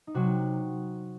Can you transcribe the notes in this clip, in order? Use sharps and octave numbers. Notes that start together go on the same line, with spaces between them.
D#4
C3 F#3 F#4